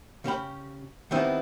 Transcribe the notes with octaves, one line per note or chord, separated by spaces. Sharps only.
C#3 C#4 G4 B5
D#3 G3 B3 C4 D#4 E4